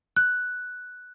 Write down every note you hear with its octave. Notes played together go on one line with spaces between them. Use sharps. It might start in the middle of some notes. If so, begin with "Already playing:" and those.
F#6